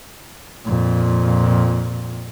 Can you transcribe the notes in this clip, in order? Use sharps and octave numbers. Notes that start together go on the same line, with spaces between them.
F2 A#2